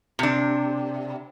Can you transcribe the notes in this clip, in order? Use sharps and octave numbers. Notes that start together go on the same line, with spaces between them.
C3 D4